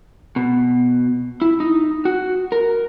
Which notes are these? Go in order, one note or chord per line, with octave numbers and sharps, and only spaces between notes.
B2
E4
D#4
F#4
A#4